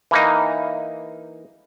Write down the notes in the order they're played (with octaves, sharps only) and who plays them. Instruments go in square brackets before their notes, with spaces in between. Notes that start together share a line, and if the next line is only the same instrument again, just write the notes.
[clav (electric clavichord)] E3 A#3 D#4